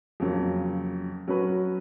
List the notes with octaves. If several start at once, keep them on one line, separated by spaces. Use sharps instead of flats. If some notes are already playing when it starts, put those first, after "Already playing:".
F2 C#3 F#3 A#3
F#3 C#4 F#4 B4